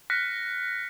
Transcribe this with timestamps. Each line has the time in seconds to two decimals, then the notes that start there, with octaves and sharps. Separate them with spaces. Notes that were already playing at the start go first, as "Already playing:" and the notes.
0.10 F6 F#6 A#6 B6 C#7